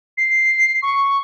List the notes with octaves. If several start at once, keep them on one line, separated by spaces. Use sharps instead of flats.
C7
C#6